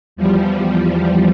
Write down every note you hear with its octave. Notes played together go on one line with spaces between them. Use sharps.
E2 F3 G3